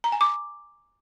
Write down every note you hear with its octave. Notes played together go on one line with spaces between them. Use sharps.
A#5
G#5
D6